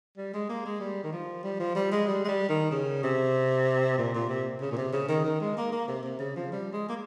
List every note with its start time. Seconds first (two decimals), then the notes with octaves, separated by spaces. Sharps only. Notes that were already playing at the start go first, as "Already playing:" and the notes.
0.17 G3
0.34 G#3
0.49 A#3
0.65 G#3
0.80 G3
1.04 D#3
1.13 F3
1.43 G3
1.60 F3
1.75 G3
1.92 G#3
2.07 G3
2.25 G#3
2.28 G3
2.49 D#3
2.71 C#3
3.03 C3
3.98 A#2
4.14 A#2
4.29 C3
4.61 C#3
4.72 A#2
4.77 C3
4.93 C#3
5.09 D#3
5.24 D#3
5.41 G#3
5.57 A#3
5.72 A#3
5.88 C3
6.03 C3
6.19 C#3
6.36 F3
6.52 G3
6.73 G#3
6.89 A#3